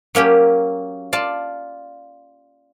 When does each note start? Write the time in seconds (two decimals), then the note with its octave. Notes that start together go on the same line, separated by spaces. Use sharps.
0.15 F#3 A#3 C#4 G4
1.13 F4 D5 A5